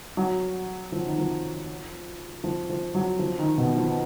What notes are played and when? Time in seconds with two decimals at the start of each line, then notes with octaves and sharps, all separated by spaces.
0.17 F#3
0.92 F3
1.06 D#3
1.18 F3
2.44 F3
2.69 F3
2.95 F#3
3.19 F3
3.39 D#3
3.58 B2
3.77 F3